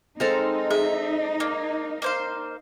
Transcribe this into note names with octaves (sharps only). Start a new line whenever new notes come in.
G#3 C4 D#4 A4 F5 A#5
G#4 E5
A#3
A#3 C5 F5